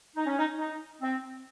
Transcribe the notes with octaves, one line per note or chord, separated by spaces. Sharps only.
D#4
C#4
D#4
D#4
C4